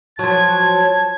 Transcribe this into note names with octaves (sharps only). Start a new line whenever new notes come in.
F3 F#3 A5 G#6